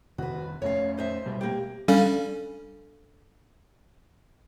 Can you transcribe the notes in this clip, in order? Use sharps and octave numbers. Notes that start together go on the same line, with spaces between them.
F2 C3 D#3 F#4 B4
F2 A3 C#4 C#5 F5
D#4 C5 E5
B2 G3 G#3
A#3 G4
G3 C#4 D4 A4 F5